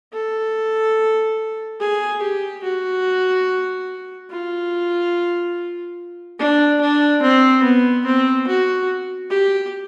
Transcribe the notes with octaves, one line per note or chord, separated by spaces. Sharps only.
A4
G#4
G4
F#4
F4
D4
D4
C4
B3
C4
F#4
G4